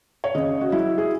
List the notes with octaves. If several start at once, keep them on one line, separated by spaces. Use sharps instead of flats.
C#5
C#3 D#5
F#4
F#3 E4
G#4